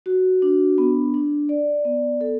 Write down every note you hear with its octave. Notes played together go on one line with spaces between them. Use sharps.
F#4
D4
B3
D4
D5
B3
A4